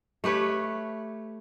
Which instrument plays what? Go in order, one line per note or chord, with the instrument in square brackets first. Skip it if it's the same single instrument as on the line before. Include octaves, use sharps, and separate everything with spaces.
[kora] A3 G4 B4 C#5